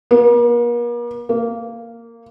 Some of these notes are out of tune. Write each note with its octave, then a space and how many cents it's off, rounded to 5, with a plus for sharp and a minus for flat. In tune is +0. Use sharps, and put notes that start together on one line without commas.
A#3 +45
A#3 -10